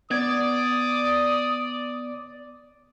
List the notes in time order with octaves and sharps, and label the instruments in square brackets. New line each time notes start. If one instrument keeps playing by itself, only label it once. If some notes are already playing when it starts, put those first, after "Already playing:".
[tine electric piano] B3 G#6 [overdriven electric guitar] D5 [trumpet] D#6